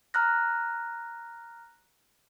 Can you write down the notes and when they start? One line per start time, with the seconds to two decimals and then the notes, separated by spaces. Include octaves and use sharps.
0.14 A#5 F6 F#6 A#6